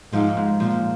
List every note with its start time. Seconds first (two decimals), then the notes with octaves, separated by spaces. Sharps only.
0.13 G#2 F3
0.37 G#2
0.60 A#2 F3